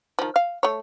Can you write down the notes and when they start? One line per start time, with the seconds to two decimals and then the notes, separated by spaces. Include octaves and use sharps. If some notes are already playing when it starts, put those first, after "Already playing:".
0.19 D#3 F3
0.36 F5
0.63 A3 C#5